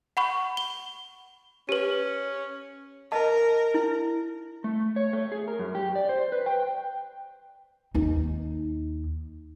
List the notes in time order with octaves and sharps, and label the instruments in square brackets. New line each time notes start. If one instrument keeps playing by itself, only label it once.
[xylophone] F#5 B5 C#6
G7
[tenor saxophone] C#4 [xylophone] G4 B4
[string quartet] A#4 [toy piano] D#5 A5
[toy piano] E4
[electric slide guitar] A3
C#5
A3
G#4
A#4
F#2
G4
D5
C5
B4
G5
[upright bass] D#2 D#4